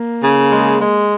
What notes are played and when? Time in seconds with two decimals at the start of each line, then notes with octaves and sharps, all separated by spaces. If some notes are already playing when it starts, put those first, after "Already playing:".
Already playing: A#3
0.22 C#3
0.51 G#3
0.80 G#3